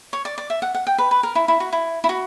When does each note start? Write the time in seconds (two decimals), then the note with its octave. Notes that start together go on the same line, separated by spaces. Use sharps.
0.13 C#5
0.25 D5
0.38 D5
0.50 E5
0.62 F#5
0.75 F#5
0.87 G5
0.98 B4
1.11 B4
1.23 A#4
1.35 E4
1.48 E4
1.60 F#4
1.73 E4
2.04 E4
2.09 F#4